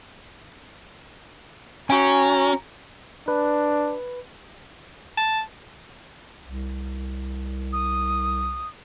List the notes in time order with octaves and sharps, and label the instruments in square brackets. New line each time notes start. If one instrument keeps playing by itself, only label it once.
[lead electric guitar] C#4 [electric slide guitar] F#4 G5 G#5 [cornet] A#5
[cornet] D4 [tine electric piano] B4
[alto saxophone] A5
[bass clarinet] C2
[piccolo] D#6